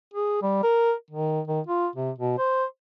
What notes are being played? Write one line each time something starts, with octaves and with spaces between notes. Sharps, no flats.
G#4
G3
A#4
D#3
D#3
F4
C3
B2
C5